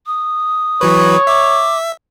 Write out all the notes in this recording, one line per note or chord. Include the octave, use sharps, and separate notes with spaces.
D#6
E3 F#3 B4 C#5
E5 D6